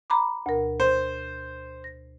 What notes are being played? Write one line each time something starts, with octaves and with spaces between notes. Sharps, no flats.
A#5 B5 D6
D2 B2 A#4
C5
A#6